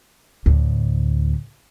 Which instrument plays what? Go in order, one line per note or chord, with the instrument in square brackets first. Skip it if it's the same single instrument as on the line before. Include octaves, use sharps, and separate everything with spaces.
[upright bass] D2 A2